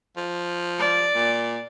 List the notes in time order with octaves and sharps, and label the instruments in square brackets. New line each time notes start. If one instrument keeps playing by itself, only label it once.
[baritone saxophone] F3
[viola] D5
[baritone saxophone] A#2